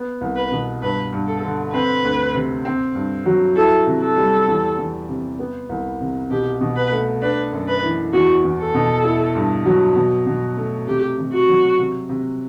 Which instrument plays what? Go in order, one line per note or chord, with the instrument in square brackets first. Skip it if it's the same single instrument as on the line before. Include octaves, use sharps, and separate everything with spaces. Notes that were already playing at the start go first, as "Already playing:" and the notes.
Already playing: [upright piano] B3
C2
[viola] B4
[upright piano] B2
[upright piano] G2 [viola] B4
[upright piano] G2
[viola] A4
[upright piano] D3
[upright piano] C4 [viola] B4
[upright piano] D2
C3
C4
G2
F#3
[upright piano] E4 [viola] A4
[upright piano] C3
[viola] A4
[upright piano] G3
E2
E2
C3
B3
C2
C3
[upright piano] B2 [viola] G4
[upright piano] B2
[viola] B4
[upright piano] A3
[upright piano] D4 [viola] B4
[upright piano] F#2
[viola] B4
[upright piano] E3
[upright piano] E2 [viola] F#4
[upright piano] E2
[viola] A4
[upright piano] B2
E4
G2
F#3
B2
B2
A3
[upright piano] C3 [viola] G4
[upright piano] C3
[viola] F#4
[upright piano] F#3
C3
C3